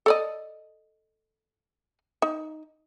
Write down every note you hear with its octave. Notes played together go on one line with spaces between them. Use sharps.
A4 D5 D#5
D#4